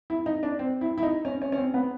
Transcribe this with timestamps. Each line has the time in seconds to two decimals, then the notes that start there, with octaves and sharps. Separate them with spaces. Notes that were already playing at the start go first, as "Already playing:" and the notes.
0.10 E4
0.26 D#4
0.43 D4
0.59 C4
0.81 E4
0.98 E4
1.03 D#4
1.25 C#4
1.42 C#4
1.52 C#4
1.58 C4
1.74 B3